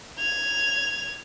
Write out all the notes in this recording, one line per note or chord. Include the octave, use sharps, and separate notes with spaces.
G#6 F7